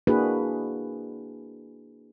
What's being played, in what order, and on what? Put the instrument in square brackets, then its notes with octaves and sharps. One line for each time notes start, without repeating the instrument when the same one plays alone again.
[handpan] A#3 D4 E4 F#4 G#4 B4